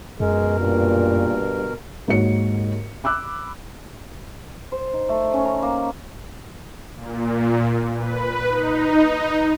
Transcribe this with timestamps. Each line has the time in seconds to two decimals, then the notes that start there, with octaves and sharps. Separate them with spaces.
0.20 F#2 B2 G#3 A#4
0.60 G2 A#2
2.07 D#2 G#2 F#4 C#5 C#7
3.04 B5 D6 E6 F#6
4.72 C5
4.93 D#4
5.09 A3
5.33 C#4
5.45 A#5
5.62 A#3
6.95 A#2
7.96 B4
8.49 D#4